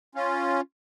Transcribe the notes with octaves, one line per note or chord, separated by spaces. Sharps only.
C#4 F4